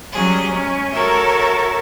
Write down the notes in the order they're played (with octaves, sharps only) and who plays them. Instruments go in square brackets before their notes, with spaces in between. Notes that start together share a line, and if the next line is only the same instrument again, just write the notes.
[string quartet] F#3 G3 C#4 G#4
G#3 C#4
F#4 A4 A#4 C#5 E5